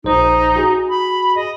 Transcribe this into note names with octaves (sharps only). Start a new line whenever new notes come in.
A#1 D#4 C5
F#4 G#4
B5
D#5